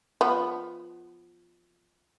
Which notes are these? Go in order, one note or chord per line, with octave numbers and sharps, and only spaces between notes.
F3 B3